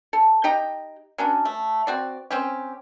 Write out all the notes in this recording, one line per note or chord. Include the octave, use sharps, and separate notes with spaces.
A4
D#4 G4 G5 A#5
F#3 C#4 D4
A3
C4 F#4 D5
C4 C#4 G4